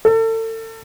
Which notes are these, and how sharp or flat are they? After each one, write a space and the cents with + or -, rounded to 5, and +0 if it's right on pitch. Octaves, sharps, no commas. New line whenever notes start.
A4 +35